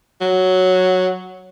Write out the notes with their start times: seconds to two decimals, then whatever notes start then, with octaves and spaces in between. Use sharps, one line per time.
0.21 F#3